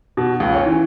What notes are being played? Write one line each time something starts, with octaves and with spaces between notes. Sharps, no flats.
B2
C#2
C#4
E3